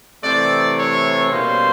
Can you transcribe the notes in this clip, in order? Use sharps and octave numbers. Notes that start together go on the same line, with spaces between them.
C3 E3 A3 C4 D5
C#5
B2 G3 A#3 C#4 C5